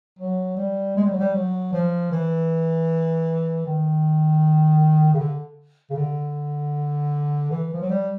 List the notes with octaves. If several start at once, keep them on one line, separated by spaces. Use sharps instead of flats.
F#3
G3
G#3
G3
F#3
G3
F#3
F3
E3
D#3
C#3
D3
C#3
D3
E3
F3
F#3
G3